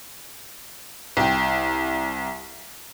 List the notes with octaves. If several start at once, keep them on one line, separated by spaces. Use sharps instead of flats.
C2 G5